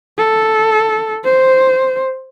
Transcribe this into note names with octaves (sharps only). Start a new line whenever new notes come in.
A4
C5